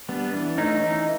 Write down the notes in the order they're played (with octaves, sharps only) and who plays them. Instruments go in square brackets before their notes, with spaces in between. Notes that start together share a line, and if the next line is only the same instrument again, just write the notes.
[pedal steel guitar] G3 B3 D4
E3 D4
A3 C#4 D#4
E3 D#4